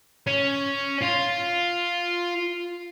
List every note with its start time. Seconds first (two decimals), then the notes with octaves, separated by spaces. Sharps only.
0.27 C#4
1.02 F4